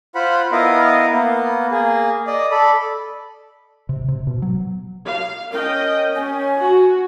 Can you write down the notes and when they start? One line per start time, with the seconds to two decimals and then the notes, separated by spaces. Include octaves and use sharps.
0.15 F4 C5 F#5 B5
0.52 B3 E4 A#4 D#5 F5
1.12 A#3 B3
1.71 A#3 G#4
2.27 D5 D#5
2.51 A4 D5 B5
3.89 C3
4.08 C3
4.27 B2
4.42 F#3
5.07 F5
5.52 C#4 A#4 D#5 G5
6.15 C#4 G#5
6.59 F#4